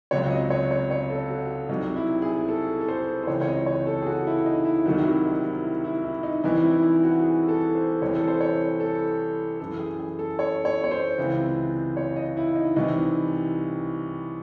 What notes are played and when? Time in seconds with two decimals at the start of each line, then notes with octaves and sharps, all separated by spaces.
0.11 C#2 C3 F#3 C#5
0.31 D#5
0.50 C#5
0.71 C#5
0.91 C#5
1.10 A4
1.29 F#4
1.69 C2 C3 F#3 D#4
1.96 E4
2.22 G#4
2.48 A4
2.81 A4
2.88 C5
3.23 C5
3.27 C#2 C3 E3 C#5
3.41 C#5
3.47 D#5
3.66 C#5
3.87 A4
4.02 G#4
4.07 F#4
4.27 E4
4.46 D#4
4.65 E4
4.85 C2 C3 D#3 F#3 F#4
4.98 E4
5.06 F#4
5.26 D#4
5.44 E4
5.64 E4
5.84 E4
6.04 E4
6.23 D#4
6.44 C2 C3 E3 D#4
6.63 E4
6.83 E4
7.03 F#4
7.23 G#4
7.48 A4
7.75 C5
8.02 C2 C3 E3 C#5
8.15 A4
8.28 C5
8.41 C#5
8.80 A4
9.60 F#2 E3 A4
9.79 G#4
10.00 G#4
10.19 A4
10.39 C#5
10.65 C#5
10.84 C#5
10.91 C5
11.18 C#2 C3 E3
11.97 C#5
12.16 D#5
12.37 E4
12.55 D#4
12.76 C2 C3 E3 D#4